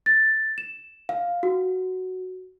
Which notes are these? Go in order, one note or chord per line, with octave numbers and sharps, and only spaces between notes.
A6
E7
F5
F#4